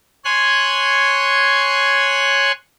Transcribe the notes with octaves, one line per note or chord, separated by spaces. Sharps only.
C#5 G#5 C6 F#6